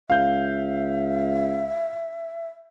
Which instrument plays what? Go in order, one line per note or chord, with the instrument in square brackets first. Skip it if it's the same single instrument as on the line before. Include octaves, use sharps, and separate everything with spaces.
[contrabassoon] C#2 [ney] E5 [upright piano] F5 G6